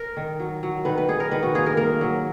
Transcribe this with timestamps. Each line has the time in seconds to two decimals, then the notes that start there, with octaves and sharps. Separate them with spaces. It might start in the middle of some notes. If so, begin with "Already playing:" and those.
Already playing: A#4
0.17 D#3
0.40 F#3
0.63 F#3
0.85 D#3 B4
0.98 B4
1.08 D#3 G#4
1.20 A#4
1.31 D#3 B4
1.43 F#4
1.55 A#3 G#4
1.66 A#4
1.77 A#3 A#4
2.01 F#3